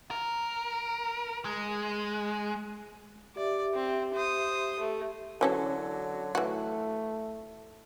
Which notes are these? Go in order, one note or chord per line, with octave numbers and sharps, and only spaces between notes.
A#4
G#3
G4 D5 E5
C4
C5 D#6
A3
D3 E3 F#3 C#4 A4
E3 A3 F#4